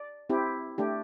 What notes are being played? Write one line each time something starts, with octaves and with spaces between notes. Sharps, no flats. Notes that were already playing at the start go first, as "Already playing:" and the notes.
Already playing: D5
C4 E4 G4
A3 D4 G4